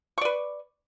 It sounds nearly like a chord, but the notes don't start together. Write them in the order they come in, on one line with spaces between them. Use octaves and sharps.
C#6 D5 B4